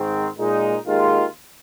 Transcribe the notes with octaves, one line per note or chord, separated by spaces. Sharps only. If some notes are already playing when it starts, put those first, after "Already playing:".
Already playing: G#2 D#3 C4
A#2 G#3 D#4
D#2 D#3 G#3 F4